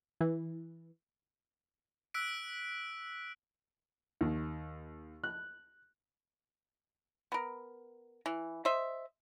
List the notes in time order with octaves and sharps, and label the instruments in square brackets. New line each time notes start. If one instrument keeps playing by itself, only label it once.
[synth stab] E3
[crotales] E6 F#6 B6 D7
[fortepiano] D#2
F#6
[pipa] B3 A#4
E3
C5 D#5 E5